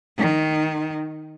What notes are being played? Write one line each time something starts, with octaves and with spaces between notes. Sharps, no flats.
D#3